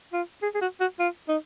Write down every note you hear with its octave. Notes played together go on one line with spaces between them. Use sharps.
F4
G#4
G#4
F#4
F#4
F4
D#4